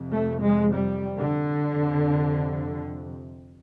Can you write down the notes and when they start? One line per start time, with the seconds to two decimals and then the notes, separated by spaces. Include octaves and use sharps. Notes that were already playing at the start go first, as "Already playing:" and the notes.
Already playing: F2 C3
0.11 A3
0.41 G#3
0.73 G3
1.19 D3
1.66 F2 C3